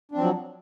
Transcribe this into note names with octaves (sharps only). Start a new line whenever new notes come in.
F3 F#3 C4 D4